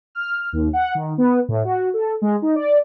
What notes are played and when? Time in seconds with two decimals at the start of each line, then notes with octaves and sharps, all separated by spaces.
0.15 F6
0.53 D#2
0.73 F#5
0.95 D#3
1.18 B3
1.48 A2
1.64 F#4
1.94 A4
2.22 G#3
2.42 D#4
2.56 D5